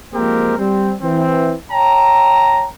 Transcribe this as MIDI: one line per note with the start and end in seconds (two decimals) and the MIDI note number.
0.14 0.54 53
0.14 0.54 56
0.14 0.54 58
0.14 0.54 60
0.14 0.54 67
0.14 0.54 70
0.58 0.94 55
0.58 0.94 60
1.01 1.54 52
1.01 1.54 60
1.72 2.67 73
1.72 2.67 79
1.72 2.67 81
1.72 2.67 82